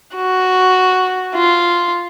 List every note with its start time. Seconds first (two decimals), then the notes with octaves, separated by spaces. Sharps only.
0.15 F#4
1.35 F4